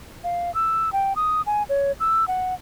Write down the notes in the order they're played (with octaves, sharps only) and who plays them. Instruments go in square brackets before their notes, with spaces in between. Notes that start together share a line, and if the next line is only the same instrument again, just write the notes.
[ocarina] F5
E6
G5
D#6
G#5
C#5
E6
F#5